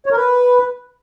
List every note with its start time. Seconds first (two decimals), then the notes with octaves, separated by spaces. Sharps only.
0.06 C#5
0.11 A#4
0.16 B4